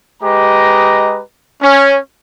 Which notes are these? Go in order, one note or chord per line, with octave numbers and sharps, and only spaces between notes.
G#3 G4 B4 D#5 A#5
C#4